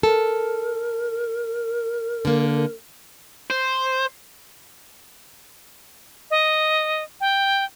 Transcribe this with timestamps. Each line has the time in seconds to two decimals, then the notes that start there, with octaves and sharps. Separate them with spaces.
0.03 A4 A#4
2.25 D3 A#3
3.50 C5
6.31 D#5
7.21 G5